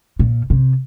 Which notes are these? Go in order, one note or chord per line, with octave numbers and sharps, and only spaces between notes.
A#2
C3